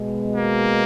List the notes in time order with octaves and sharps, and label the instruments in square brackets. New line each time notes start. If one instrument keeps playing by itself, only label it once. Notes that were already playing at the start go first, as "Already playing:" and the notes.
Already playing: [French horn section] B2 G#3 B3
[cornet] A#3